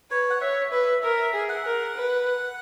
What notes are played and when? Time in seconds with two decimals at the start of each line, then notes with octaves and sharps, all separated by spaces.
0.11 B4 C#5
0.30 F#5
0.41 C#5 E5
0.72 B4 E5
1.02 A#4 E5
1.33 G#4
1.49 F#5
1.65 A#4
1.95 B4